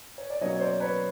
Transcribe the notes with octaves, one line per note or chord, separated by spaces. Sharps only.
C#5
D5
B2 F#3 A#3 C#4 C#5 D#5
C#5
C5 D5
B4 C#5